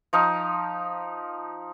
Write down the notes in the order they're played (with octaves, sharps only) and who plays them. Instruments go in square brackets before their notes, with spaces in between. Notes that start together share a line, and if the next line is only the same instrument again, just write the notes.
[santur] F3 D#4 F5